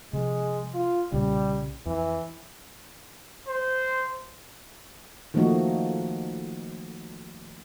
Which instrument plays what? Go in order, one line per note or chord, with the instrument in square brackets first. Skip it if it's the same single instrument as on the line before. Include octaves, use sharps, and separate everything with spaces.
[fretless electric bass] C3 F3 [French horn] G#3
[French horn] F4
[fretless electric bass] B1 A#2 C#3 [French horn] G3
[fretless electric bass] F2 [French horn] E3
[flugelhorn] C5
[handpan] D#3 F3 A3 A#3 D#4 F#4